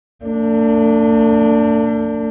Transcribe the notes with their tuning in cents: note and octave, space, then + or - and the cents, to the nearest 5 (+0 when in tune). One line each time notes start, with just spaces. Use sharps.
A3 +45 D4 -10